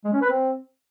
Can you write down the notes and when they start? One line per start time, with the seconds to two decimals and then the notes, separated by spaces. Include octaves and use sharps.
0.04 G#3
0.13 C#4
0.21 B4
0.30 C4